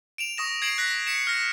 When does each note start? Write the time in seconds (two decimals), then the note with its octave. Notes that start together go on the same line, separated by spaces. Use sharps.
0.18 D7 E7 F7
0.38 C#6 D#6 A#6 E7
0.62 G#6 C7 D7 E7 F#7
0.78 F#6 A#6 B6
1.07 B6 C#7 E7
1.27 F6 A#6